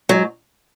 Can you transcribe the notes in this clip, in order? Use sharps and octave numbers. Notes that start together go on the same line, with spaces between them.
G#2 F#3